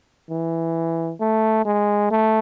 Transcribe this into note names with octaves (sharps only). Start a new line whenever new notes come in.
E3
A3
G#3
A3